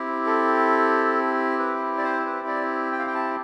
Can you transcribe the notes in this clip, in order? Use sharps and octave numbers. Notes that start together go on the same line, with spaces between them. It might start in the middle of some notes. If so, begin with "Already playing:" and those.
Already playing: C4 E4 G4
A4
B4
D5
C5
B4
D5
G5
F5
G5
A5